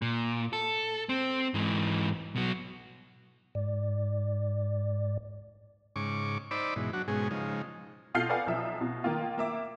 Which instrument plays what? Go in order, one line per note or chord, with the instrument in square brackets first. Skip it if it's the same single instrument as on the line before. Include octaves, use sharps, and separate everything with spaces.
[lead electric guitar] A#2
A4
C4
G#2 E3
B2 F#3
[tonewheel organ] G#2 D5
[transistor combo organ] G#2 C#3 C#6 D6
D#4 C5 D5 B5 D6 E6
G#2 B2 E3
F#3 D4 F#4
G#2 B2 G#3 C#4 G#4
C#3 F3 G#3 D#4
[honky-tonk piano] B2 F4 A4 F6 G6 C7
A4 B4 D5 F5 F#5 G#5
B1 F3 E5
B2
D#3 A#3 F4
A#3 E5 D6